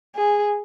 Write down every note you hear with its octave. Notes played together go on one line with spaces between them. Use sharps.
G#4